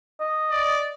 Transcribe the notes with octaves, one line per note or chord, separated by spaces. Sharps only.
D#5
D5